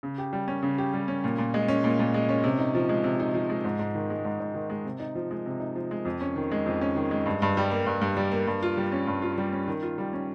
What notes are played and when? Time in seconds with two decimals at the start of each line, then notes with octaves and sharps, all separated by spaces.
0.03 C#3
0.18 G4
0.33 G3
0.48 C#4
0.63 C#3
0.78 G4
0.94 G3
1.08 C#4
1.24 A#2
1.38 A#2
1.54 G#3
1.68 C#4
1.84 A#2
1.99 A#2
2.14 G#3
2.29 C#4
2.44 C3
2.59 D#4
2.75 F3
2.89 G#3
3.04 C3
3.20 D#4
3.34 F3
3.50 G#3
3.65 G#2
3.79 G#2
3.95 D#3
4.10 G#3
4.25 G#2
4.40 G#2
4.54 D#3
4.70 G#3
4.85 C3
5.00 D#4
5.15 F3
5.31 G#3
5.46 C3
5.60 D#4
5.76 F3
5.91 G#3
6.05 F2
6.21 C#4
6.36 D#3
6.51 G#3
6.66 F2
6.81 C#4
6.96 D#3
7.11 G#3
7.26 G2
7.42 G2
7.57 G3
7.71 A#3
7.86 G2
8.01 G2
8.17 G3
8.32 A#3
8.47 G2
8.63 F4
8.77 G3
8.92 C#4
9.07 G2
9.22 F4
9.38 G3
9.53 C#4
9.68 D#3
9.82 F4
9.98 G3
10.13 C#4